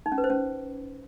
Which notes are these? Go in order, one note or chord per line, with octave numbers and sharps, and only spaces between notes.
D#4
C#4
B4
C5
C#4